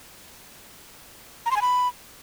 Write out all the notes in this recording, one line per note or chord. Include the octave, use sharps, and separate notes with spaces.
A#5
C6
G#5
B5